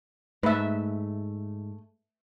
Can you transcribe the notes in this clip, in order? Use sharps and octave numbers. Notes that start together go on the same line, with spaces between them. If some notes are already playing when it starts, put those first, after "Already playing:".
G#2 A3 B4 E5 G#5